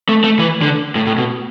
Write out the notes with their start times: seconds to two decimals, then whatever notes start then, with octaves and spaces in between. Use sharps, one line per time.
0.09 A3
0.24 A3
0.39 E3
0.62 D3
0.95 A2
1.07 A2
1.18 B2